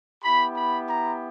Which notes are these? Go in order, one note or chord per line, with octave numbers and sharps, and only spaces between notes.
B3 E4 G4 B5
B5
A#5